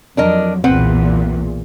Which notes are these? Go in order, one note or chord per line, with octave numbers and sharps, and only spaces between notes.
F2 F#3 D4 A#4 D#5
B1 E2 A#2 C4 B4 F#5